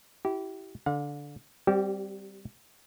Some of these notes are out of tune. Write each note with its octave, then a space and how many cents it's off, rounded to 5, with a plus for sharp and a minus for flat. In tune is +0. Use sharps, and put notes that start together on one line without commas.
E4 +0 G4 -30
D3 -10 F5 +45
G3 +0 C4 +0 G4 -40